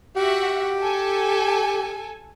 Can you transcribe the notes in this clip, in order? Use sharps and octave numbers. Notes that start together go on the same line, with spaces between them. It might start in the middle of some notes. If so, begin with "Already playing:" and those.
F#4 G4 E5 F#5
A4 G#5